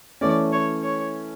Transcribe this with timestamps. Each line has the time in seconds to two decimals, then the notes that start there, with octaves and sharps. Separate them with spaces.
0.21 E3 A3 C#4 D5
0.52 C#5
0.83 C#5